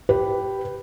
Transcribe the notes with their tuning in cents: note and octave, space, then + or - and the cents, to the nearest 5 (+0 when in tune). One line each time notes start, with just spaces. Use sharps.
G4 -10 B4 +0